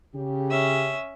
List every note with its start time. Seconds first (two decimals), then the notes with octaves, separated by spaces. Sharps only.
0.15 C#3 G4
0.51 C#4 E5